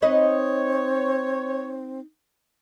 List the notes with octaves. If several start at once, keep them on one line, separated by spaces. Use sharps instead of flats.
C4 D#4 B4 C#5 D#5